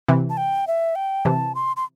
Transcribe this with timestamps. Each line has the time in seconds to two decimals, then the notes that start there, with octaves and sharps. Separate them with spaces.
0.08 C3 E3
0.30 A5
0.37 G5
0.67 E5
0.95 G5
1.25 C3 E3 A5
1.55 C6
1.76 C6